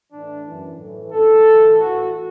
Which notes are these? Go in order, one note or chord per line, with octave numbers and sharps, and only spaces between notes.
A2 E3 D4
F#2 E3
A2 E3
F#2 D3 A4
A2 E3
A2 E3 F#4